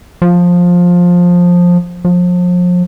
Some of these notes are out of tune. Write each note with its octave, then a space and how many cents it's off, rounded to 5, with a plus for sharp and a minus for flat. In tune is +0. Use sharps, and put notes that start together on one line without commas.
F3 +15
F3 +35